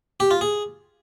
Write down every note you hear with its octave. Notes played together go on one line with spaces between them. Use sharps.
G4
F4
G#4